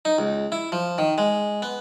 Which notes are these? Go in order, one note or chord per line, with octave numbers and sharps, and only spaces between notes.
D#4
C#2
E4
F3
D#3
G#3
B3